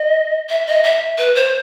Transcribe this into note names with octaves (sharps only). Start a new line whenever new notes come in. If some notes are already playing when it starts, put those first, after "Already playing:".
Already playing: D#5
E5
D#5
E5
B4
C5